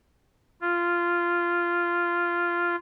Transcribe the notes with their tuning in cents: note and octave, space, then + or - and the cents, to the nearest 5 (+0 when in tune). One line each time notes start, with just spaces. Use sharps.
F4 -10